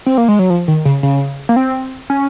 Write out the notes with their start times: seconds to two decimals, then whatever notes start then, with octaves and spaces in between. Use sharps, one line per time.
0.06 C4
0.18 A#3
0.28 G#3
0.39 F#3
0.50 F3
0.68 D#3
0.85 C#3
1.03 C#3
1.49 A#3
1.56 C4
2.10 C#4